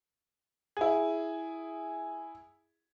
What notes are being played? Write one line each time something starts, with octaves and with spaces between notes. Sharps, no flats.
E4 G#4